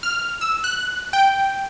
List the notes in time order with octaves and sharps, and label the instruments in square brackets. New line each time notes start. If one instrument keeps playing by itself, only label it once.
[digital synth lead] F6
E6
F#6
G5